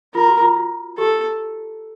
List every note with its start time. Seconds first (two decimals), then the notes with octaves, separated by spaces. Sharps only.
0.14 F4 A#4
0.28 F#4
0.41 F4
0.56 F4
0.98 G4 A4